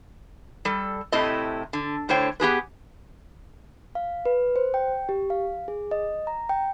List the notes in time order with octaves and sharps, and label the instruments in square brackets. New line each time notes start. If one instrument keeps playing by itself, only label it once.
[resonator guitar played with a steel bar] G3 A4
A2 C3 A3 E4 D#5
D3
A2 D3 C5 C#5 G5
B3 G4 G#4 B4
[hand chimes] F5
B4
C5
G5
G4
F5
G#4
D#5
A#5
G5